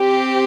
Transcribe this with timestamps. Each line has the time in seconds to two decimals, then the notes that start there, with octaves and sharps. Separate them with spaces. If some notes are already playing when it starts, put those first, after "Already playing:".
Already playing: C4 G4